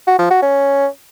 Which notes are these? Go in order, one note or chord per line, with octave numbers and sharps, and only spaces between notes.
F#4
F3
F#4
C#4